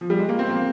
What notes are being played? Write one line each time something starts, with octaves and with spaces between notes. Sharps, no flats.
F3
G3
G#3
A#3
C4
A#3